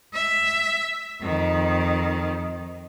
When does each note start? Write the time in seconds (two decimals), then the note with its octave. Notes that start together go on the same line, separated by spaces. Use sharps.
0.14 E5
1.22 F2 D#3